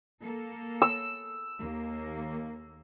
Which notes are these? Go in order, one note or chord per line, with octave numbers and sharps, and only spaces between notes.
A#3 A4
E6
D#2 A#3